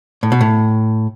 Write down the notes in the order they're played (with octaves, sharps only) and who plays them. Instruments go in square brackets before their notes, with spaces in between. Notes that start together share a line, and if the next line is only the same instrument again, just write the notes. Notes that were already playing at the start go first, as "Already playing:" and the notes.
[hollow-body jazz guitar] A2
B2
A2